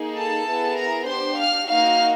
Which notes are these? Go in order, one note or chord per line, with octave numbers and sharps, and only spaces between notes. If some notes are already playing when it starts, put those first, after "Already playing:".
Already playing: A#3 D#4 G#4
A4 A5
B3 E4 G#4
A#4 A#5
D4 G4 C5 C6
F5 F6
A#3 D#4 F#4 F5 F6